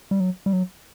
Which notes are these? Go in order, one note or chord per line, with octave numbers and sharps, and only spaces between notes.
G3
F#3
G3
F#3